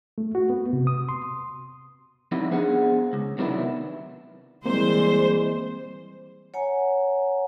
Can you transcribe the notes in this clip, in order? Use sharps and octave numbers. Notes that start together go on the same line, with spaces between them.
A3
F#4
B3
C3
D#6
C6
F3 G3 B3 C4 D#4 E4
B3 D4 G#4 C5 F#5
C#2
C3 D#3 F#3 B3 D4 E4
E3 G3 G#3 A#3 C4 C5
C#5 F#5 G#5 A#5